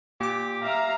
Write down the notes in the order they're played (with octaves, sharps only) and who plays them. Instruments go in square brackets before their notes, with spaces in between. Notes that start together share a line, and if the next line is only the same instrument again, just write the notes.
[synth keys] A#2 D6 [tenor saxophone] G4
[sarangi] E5 [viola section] F5 A#5